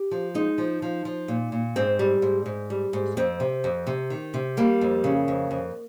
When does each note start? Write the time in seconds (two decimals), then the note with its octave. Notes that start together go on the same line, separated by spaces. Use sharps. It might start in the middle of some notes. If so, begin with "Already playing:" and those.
Already playing: G4
0.11 F3
0.34 G#3 D#4
0.58 F3
0.82 F3
1.05 F3
1.28 A#2
1.52 A#2
1.76 G#2 C4
1.99 G3
2.22 G#2
2.46 G#2
2.70 G3
2.93 G#2
3.17 F2 C4
3.40 C3
3.64 F2
3.87 C3
4.10 D#3
4.34 C3
4.57 G3 A#3
4.81 F2
5.04 C#3
5.28 F2
5.51 F2